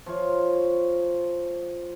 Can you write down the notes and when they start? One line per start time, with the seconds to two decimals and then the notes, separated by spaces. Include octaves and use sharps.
0.06 F3 F4 C#5